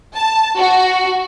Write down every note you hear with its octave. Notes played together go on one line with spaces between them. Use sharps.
A5
F#4